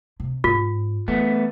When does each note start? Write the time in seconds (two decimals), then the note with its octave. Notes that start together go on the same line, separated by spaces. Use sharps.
0.20 C3
0.44 G#2 F4
1.08 E3 A3 B3